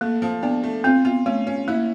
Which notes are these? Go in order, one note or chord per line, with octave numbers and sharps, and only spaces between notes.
A3 A#3
F3
B3 D4
A3
C4 F4
B3 F4
A3 C#4
C#4
A#3 E4